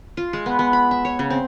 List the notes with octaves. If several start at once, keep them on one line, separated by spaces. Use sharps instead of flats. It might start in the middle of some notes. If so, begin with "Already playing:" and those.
F4
G#3
B3
B3
B5
E5
C#5
C#3
C4